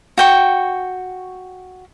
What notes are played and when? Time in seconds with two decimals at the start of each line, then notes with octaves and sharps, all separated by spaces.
0.18 F#4 G5 C#6